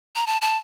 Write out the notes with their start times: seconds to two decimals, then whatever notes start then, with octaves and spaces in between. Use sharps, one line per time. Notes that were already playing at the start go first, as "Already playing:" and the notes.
0.15 A#5
0.27 A5
0.42 A5